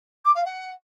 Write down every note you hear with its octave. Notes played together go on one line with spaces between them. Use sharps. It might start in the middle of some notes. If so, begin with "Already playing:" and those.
D6
F5
F#5